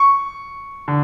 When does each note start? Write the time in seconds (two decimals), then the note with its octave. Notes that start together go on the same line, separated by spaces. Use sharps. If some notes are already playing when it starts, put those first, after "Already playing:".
Already playing: C#6
0.88 D3